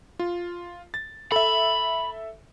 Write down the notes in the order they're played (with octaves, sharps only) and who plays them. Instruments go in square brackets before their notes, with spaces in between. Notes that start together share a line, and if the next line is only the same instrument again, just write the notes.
[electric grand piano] F4
A6
[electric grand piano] A4 E5 [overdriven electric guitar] B5